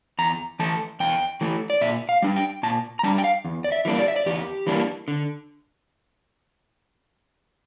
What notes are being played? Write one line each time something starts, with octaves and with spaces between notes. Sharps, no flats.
E2 A#5
E3 A3 A5
E2 G5
E3 A3
D5
A#2 E5
F5
G3 D4
G5
A#2 A5
A#5
G3 D4 A5
G5
F5
E2
D5
E5
E3 G3 A#3 D4
D5
E5
D5
E2 G4
E3 G3 A#3 D4
D3